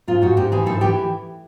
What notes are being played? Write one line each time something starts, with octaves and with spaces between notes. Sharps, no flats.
G#2 F4
G#2 F#4
G#2 G4
E3 G#4
G#2 A4
E3 G4